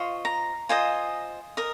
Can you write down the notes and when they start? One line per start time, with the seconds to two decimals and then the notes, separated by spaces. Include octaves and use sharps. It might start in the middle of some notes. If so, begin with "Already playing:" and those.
Already playing: F4 C5 D#5 C#6
0.25 A#5
0.69 F4 C5 D#5 G#5
1.57 A#4 D#5